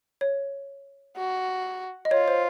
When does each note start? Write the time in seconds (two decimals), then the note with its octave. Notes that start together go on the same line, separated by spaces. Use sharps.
0.21 C#5
1.17 F#4
2.05 D#5
2.11 F4 C#5
2.28 C5